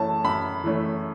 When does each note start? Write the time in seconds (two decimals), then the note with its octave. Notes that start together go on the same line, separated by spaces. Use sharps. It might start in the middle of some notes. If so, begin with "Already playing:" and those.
Already playing: F#2 E3 A3 C#4 A5
0.24 F#2 B5
0.64 E3 A3 C#4